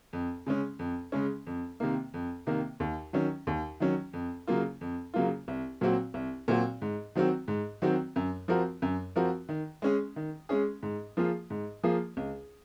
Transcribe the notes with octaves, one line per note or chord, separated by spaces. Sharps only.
F2
C#3 G#3 C#4
F2
C#3 G#3 C#4
F2
C3 D#3 A#3
F2
C3 D#3 A#3
D#2
D#3 F#3 C#4
D#2
D#3 F#3 C#4
F2
C#3 F#3 A#3 F4
F2
C#3 F#3 A#3 F4
C2
A#2 F#3 C4 F#4
C2
A#2 F#3 C4 F#4
G#2
D#3 F#3 C4 F#4
G#2
D#3 F#3 C4 F#4
F#2
F3 C4 F#4 A#4
F#2
F3 C4 F#4 A#4
D#3
G#3 C#4 G#4
D#3
G#3 C#4 G#4
G#2
F3 A#3 F4 G#4
G#2
F3 A#3 F4 G#4
C#2